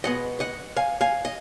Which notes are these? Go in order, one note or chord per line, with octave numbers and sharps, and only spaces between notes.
B2 G#3 B3 D#5 F#5
D#5 F#5
F5 G#5
F5 G#5
D#5